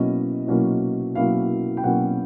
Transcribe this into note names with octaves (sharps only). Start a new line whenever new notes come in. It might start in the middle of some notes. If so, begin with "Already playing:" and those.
Already playing: B2 F#3 A#3 C#4 E4 D#5
B2 F#3 A#3 C#4 E4
B2 F#3 A#3 C#4 E4 F5
G5
B2 F#3 A#3 C#4 E4 F#5